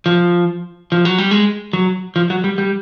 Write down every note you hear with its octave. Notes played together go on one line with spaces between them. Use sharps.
F3
F3
F#3
G3
G#3
F#3
F3
F#3
G3
G3